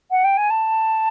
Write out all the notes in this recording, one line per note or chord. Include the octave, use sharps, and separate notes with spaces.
F#5
G5
G#5
A5